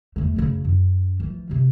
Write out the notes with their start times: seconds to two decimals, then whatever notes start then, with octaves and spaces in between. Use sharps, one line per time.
0.16 E2 A3
0.36 F#2 C#3
0.65 F#2
1.20 E3 F3
1.50 F#2 C3